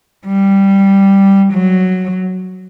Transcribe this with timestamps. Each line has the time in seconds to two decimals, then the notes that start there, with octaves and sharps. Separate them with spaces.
0.26 G3
1.53 F#3